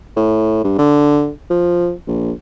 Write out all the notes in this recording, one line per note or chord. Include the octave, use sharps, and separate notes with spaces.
A2
G2
D3
F3
A#1